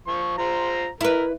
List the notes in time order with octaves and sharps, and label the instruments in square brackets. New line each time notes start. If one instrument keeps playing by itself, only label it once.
[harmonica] F3 C#6
F4 C5 A#5
[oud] E4 B4 [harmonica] A#4